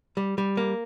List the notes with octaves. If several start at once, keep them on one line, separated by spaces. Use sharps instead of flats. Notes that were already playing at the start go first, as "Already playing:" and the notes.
G3
G3
A#3